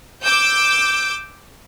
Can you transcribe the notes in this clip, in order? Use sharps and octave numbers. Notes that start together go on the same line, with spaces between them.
D6 E6 G6